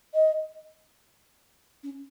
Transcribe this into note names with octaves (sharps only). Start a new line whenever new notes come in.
D#5
C#4